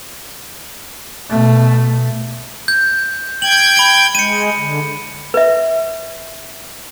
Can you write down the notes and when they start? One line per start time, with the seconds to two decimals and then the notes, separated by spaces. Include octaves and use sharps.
1.30 B2 A3
2.68 G6
3.42 G5 G6 G#6 F#7
3.77 B5 D7
4.15 G#3 C#7 D#7
4.56 D3
5.34 B4 E5